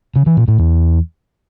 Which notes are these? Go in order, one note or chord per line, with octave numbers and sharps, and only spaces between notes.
C#3
E3
A#2
A2
E2